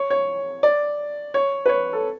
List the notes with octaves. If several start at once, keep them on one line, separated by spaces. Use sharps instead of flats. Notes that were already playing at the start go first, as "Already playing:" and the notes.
Already playing: C#5
C#5
D5
C#5
B4
C#5
A4